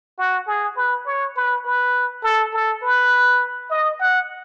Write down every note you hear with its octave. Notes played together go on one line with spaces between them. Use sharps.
F#4
G#4
B4
C#5
B4
B4
A4
A4
B4
D#5
F#5